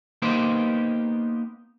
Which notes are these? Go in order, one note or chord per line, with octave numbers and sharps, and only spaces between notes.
A#3 B3 D#4 G4 A#4 C5